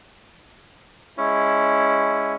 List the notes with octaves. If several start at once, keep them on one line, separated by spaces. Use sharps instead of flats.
G#3 C#4 E4